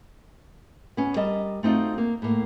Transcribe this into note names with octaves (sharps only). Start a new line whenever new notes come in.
B3 C#4
G3 A#4 D#5 A5
A3 C4 D#4 F4 F#4
A#3
A2 A#3